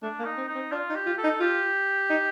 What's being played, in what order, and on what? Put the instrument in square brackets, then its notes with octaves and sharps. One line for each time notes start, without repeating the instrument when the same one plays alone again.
[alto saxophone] A3 [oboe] D4
[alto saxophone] A#3
[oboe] D#4
[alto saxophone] C4
[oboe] D#4
[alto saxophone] C4
[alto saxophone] D4 [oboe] F4
[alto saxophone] D#4
[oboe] G4
[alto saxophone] F4
[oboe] A4
[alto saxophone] D#4
[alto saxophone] F4 [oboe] G4
[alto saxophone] D#4